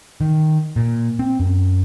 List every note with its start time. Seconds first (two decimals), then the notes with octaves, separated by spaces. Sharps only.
0.21 D#3
0.76 A#2
1.19 C4
1.40 F#2